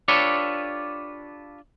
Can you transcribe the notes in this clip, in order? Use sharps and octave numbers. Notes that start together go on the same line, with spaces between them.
D4 F4 G4 A4 B4 C#5